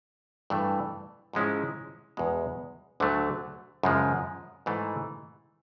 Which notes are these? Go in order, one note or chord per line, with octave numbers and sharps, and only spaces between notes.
G2 E3 A3
G#2 F3 G#3 C#4 E4
E2 B2 G#3
D2 D3 F#3 A3
F#2 C#3 F3 G#3
G#2 E3 A3